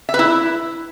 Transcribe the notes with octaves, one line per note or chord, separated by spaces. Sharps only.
E5
B4
E4